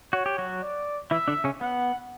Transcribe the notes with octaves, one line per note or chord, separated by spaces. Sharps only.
F#4 C#5
G4
F#3 F#4
D5
E3 E4 E5
D3 D4
C#3 C#4
B3 F#5